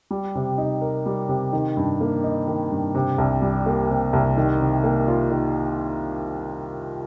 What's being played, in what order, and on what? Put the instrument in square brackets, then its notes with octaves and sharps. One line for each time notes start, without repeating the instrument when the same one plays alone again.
[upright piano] G3
C3
D#4
A#4
G3
C3
D#3
G2
A#3
D#4
D#3
G2
C3
C2
G3
A#3
C3
C2
D#3
C3
A#3
F4
D#3